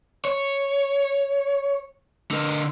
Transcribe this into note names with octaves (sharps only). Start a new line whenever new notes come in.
C#5
D3 A#4